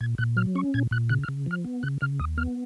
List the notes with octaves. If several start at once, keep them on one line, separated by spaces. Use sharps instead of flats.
A#2 G#6
A#2 F#6
F#3 F6
C#4 C#6
A#2 G#6
A#2 F#6
C#3 F#6
F6
C#3
F3 F6
B3
C#3 F#6
C#3 F6
D#2 D#6
B3 F6